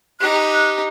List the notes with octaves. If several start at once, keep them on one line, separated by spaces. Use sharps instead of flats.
D#4 G4 F#6